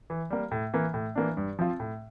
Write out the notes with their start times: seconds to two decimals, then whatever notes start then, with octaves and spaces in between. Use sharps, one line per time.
0.10 E3
0.30 G3 A#3
0.51 A2
0.74 E3 A#3
0.94 A2
1.15 E3 A#3 D4
1.37 G2
1.59 F3 C4 F4
1.80 A2